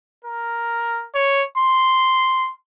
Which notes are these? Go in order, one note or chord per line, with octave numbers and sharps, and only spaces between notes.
A#4
C#5
C6